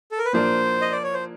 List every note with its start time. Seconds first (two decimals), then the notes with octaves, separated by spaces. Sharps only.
0.11 A4
0.18 A#4
0.25 B4
0.33 A#2 F3 A#3 D4 C5
0.81 D#5
0.92 D5
1.04 C#5
1.14 C5